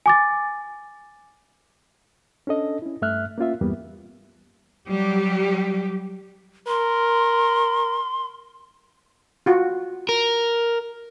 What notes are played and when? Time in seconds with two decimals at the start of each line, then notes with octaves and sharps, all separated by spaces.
0.06 G#5 D6 A6
2.47 C#4 D4 A4 D#5
2.82 C#4 E4
3.02 G2 A3 E5 F6 F#6
3.38 A#3 C#4 F4 E5
3.61 E2 G2 G3 A#3 B3
4.88 F#3 G3 G4
6.68 A#4 C6
9.46 F4 F#4
10.09 A#4